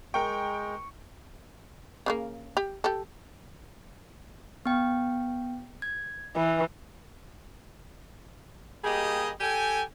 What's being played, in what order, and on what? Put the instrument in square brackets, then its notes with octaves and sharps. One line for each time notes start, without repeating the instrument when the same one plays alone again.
[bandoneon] G#3 [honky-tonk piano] A#4 G5 [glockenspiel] C#6 C#7
[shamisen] C#3 F3 A#3
G4
G4 A4
[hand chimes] B3 G5
G#6
[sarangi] E3 [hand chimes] B4
[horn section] G3 A#3 G4 G#4 D#5
G4 A4 G5 G#5